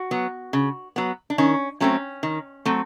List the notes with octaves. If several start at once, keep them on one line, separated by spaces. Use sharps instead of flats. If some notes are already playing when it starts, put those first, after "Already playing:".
Already playing: F#4
F#3 B3
C#3
F#3 B3
D4
D#3 C#4
F#3 A3 C4 C#4
D#3
F#3 A3 C4